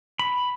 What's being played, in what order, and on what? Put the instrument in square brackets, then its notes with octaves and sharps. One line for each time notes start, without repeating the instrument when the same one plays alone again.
[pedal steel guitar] B5